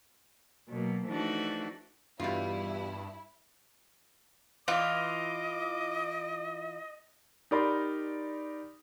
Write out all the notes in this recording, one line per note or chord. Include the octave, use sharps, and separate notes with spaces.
B2 F#3 A#3
E3 F3 A3 D4 D#4 F#4
E2 G2 B2 G3 E4 F4
E3 F4 D#5 D6
D#4 G4 A#4 D5 B5 C6